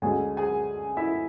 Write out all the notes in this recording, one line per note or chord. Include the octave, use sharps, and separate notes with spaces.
D2 D3 G#3 C#4 G#4 G#5
G#4 G#5
E4 E5